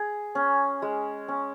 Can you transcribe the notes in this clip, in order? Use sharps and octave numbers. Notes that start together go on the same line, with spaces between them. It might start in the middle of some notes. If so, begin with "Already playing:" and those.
Already playing: G#4
C#4
G#3
C#4